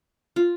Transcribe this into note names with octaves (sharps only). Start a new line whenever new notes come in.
F4